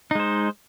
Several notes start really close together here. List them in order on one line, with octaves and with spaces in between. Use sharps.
D#4 G#3 C5